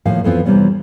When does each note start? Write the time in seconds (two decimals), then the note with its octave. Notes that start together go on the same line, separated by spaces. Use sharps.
0.05 D#2 A2 F3 F5
0.24 F2 E3 B3 C4 F4
0.45 C3 E3 G3 B3 C#4